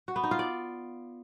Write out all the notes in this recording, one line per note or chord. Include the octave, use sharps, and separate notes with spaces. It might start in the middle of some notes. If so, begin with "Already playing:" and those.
F#4
B3
D#4
F4
D5